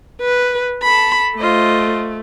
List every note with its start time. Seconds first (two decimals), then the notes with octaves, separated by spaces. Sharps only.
0.21 B4
0.83 A4 A5 B5
1.37 A3 F4 C5 D#5